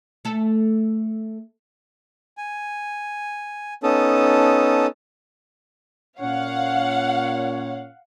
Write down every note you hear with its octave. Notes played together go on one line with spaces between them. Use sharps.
A3 A4
G#5
B3 C#4 D#4 A4 A5 D#6
A#2 C#4 C#5 F5 F#5